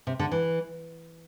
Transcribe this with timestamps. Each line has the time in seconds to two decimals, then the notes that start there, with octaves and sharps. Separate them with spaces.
0.07 C3
0.19 D3
0.32 E3